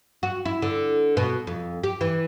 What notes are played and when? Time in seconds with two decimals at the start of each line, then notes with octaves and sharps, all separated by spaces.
0.23 F#4
0.45 E4
0.62 D3
1.17 B2
1.47 F2
1.84 G4
2.01 E3